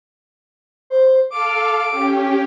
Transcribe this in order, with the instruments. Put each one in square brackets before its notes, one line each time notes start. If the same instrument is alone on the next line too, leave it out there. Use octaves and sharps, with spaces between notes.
[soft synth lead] C5
[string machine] A4 F5 [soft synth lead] D6
[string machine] C#4 G4